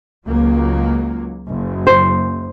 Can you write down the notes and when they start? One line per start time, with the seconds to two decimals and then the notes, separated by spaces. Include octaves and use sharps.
0.25 C#2 F#3 A#3
1.50 F#1
1.87 C5